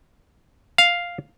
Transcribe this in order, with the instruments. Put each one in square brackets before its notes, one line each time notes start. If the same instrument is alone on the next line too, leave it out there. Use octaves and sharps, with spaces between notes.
[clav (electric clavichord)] F5